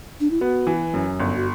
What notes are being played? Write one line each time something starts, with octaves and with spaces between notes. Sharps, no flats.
D4
E4
B3 F#4
E3
F#2
G1
F#4